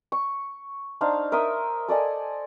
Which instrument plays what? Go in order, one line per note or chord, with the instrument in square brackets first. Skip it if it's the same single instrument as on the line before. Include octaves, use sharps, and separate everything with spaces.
[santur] C#6
D4 D#4 C5 F5
A#4 E5 C6 D#6
A4 D5 D#5 G#5